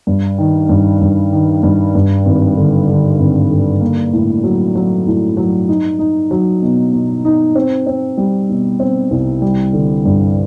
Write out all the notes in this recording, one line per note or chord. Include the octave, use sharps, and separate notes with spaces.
G2
D#3
G2
G2
D#3
G2
G2
G#1
D3
D3
G#1
D3
A#3
A2
F#3
F#3
A2
F#3
D#4
D#4
F#3
B2
B2
D#4
C4
C4
G3
B2
C4
C2
G3
D3
G2